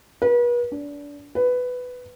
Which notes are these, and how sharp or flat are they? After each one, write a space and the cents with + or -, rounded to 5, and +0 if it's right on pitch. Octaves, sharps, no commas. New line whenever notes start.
B4 -40
D4 -25
B4 +10